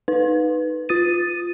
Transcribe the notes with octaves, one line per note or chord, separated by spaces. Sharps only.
D#4 B4
F4 D#6 A6 D#7